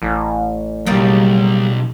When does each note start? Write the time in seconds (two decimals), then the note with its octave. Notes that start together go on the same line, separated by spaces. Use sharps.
0.02 A1
0.86 B1 E2 C#3 G3 A#3